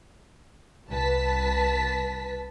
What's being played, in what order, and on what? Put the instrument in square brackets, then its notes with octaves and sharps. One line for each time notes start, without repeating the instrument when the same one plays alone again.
[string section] C2 B4 A5 B6